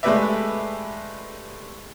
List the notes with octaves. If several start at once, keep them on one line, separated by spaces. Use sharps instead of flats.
G#3 A3 G4 B4 D5 E5